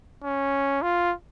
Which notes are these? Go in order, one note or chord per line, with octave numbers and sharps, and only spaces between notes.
C#4
F4